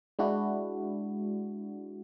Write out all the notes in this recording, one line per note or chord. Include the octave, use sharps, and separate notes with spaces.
G#3 D4 E4 F#4